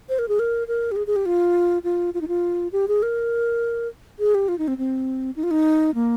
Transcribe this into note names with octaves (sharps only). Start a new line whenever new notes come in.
C5
A#4
G#4
A#4
A#4
G4
G#4
G#4
G4
F4
F4
F4
D#4
F4
G4
G#4
A#4
G#4
G4
F4
D#4
C4
C4
D#4
F4
D#4
A#3